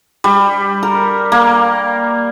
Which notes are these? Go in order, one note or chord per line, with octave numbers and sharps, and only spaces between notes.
G3
A#4
A#3